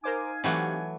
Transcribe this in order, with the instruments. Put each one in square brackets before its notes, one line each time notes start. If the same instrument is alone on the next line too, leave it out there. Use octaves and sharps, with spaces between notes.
[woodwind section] D#4 F5 G#5 [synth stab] A#4 C5 D6
[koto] E3 F#3 A3 [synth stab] C4 G4 F#5